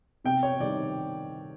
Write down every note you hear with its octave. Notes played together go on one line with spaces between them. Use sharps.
C3 G5
C#5
D#3 G3 D5